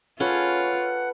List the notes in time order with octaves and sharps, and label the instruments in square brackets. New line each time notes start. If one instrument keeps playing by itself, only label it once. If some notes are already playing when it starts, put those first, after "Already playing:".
[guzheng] C#4 [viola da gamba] F4 [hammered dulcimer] A4 B4 [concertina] F#5